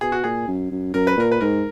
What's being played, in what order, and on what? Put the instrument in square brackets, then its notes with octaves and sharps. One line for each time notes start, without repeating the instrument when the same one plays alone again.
[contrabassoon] B2 [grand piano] G#4
[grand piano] F#4
[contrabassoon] A#2 [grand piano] G#4
[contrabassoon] F#2
F#2
[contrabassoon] F#2 [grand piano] A#4
[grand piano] B4
[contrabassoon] A#2 [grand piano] A#4
[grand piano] B4
[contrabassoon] G#2 [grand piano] A#4